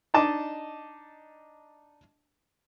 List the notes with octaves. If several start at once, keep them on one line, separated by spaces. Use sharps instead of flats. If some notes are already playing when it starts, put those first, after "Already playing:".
D4 D#4 D#5 A5 D6